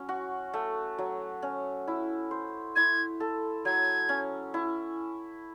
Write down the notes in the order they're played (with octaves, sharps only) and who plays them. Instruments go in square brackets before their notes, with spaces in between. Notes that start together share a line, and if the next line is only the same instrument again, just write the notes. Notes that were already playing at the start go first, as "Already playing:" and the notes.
Already playing: [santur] F#3 C#4
F#4
A3
F#3
C#4
E4
C5
[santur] E4 [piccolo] G#6
[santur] A4
[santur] F#3 [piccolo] G#6
[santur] C#4
E4